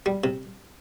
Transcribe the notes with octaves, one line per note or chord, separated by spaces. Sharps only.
G3
C3